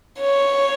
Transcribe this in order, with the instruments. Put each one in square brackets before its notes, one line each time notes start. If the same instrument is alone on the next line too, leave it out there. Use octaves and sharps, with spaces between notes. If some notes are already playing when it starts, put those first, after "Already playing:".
[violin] C#5